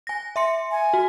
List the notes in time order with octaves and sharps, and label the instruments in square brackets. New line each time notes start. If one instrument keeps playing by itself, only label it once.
[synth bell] G#5 A#6
E5 C6 C#7
[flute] G#5
[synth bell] F#4